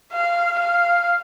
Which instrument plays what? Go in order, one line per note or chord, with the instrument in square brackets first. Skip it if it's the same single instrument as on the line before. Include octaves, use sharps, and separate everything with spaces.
[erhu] F5
F5